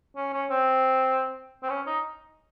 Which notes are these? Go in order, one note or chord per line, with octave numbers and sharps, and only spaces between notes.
C#4
C#4
C4
C4
C#4
D#4